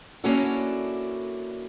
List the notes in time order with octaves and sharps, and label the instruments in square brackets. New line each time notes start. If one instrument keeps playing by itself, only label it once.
[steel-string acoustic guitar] A#3 C#4 D4 E4 F#4 A4